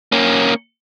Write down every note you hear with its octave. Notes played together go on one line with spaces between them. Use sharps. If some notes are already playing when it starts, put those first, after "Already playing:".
A#3 C#4